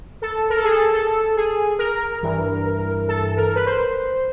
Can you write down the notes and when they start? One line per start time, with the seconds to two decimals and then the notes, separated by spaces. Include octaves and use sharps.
0.22 A4
0.50 A#4
0.56 A4
0.64 G#4
0.71 A4
0.93 A4
1.36 G#4
1.78 A#4
2.23 G2 E3
3.08 A4
3.37 A#4
3.55 B4
3.66 C5